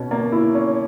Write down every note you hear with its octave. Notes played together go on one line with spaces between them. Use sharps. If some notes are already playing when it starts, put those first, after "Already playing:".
Already playing: B2 C#4
A#3
E4
C#4